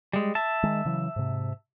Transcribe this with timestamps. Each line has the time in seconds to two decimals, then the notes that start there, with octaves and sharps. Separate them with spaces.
0.13 G3 G#3
0.35 E5 A5
0.63 D#3 G#3
0.85 C#3 E3 F#3
1.16 G#2 C3